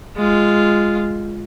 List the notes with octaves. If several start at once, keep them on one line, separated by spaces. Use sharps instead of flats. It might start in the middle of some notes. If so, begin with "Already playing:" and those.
G#3 F4